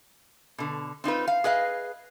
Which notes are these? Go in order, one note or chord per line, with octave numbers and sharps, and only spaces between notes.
B2 D3
C4 D#4 F4 B4
F5
G#4 B4 D#5 F5